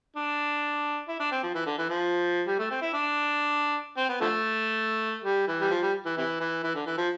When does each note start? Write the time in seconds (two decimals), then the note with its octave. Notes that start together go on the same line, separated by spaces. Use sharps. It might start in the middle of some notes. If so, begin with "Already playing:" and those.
0.16 D4
1.08 E4
1.20 D4
1.32 C4
1.43 F3
1.54 E3
1.66 D3
1.78 E3
1.89 F3
2.47 G3
2.59 A3
2.71 C4
2.82 E4
2.93 D4
3.98 C4
4.09 B3
4.21 D3 F3 A3
5.24 G3
5.48 E3
5.61 G3
5.70 F3
5.82 G3
6.05 E3
6.17 C3 E3
6.40 E3
6.63 E3
6.75 D3
6.86 E3
6.98 F3